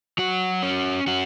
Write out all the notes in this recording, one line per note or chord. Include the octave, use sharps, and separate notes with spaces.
F#3 F#4
C#4
C#4 F#4